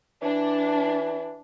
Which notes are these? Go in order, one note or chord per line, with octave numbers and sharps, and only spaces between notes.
E3 D4